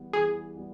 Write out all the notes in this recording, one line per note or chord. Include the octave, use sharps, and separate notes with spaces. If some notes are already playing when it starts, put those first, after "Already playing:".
Already playing: E3 G3 B3
E3 G#4
G3 B3